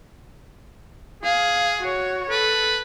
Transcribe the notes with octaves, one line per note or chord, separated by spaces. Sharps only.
G#4 F5
F#4 C#5
A4 B4